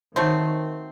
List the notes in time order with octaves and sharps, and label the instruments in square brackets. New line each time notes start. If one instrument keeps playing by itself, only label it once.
[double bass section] D#3 [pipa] F#3 A3 C4